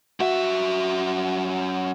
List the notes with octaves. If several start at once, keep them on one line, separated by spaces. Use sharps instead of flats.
F#2 F#4 E5